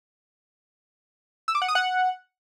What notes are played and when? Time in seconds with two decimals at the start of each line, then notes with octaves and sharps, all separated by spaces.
1.48 E6
1.55 D6
1.62 F#5
1.68 D#6
1.75 F#5